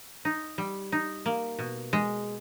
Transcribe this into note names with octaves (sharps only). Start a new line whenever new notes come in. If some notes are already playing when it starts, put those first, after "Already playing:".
D#4
G3
D#4
A#3
B2
G#3